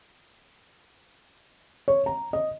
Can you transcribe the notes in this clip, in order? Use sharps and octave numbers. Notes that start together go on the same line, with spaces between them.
C#5
A#5
D#5